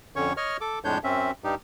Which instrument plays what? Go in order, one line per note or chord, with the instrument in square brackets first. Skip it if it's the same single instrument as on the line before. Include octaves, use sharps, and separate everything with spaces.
[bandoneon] F2 D3 C#4 C#5 C#6
C#5 D#5 C#6 F6
A4 D6
F2 A2 G#3 D4 C#5 G6
F#2 C4 C#4 E5
G2 G3 D#4 G4